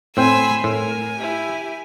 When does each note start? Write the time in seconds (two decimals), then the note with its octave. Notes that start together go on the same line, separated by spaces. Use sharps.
0.17 A2 C4 G5 G#5 B5 C6 E6
0.64 A2 A#4 G#5
1.18 E4 G4